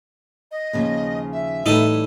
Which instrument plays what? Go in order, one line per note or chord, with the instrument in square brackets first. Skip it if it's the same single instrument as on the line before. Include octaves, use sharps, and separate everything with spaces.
[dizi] D#5
[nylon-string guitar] D#2 C#3 F3
[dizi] E5
[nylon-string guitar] A2 E3 G3 [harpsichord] D#4 A4